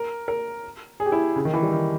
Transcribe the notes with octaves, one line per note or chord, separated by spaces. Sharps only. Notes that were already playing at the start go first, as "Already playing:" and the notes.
Already playing: A#4
A#4
G#4
G4
E4
C#3
D#3
E3
G3
D#3